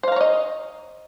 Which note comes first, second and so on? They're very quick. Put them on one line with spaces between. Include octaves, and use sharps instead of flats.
C5 F5 A#5 C#5 D#5